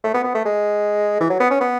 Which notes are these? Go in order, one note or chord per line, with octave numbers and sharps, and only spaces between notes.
A3
B3
B3
A3
G#3
E3
F#3
B3
C#4
B3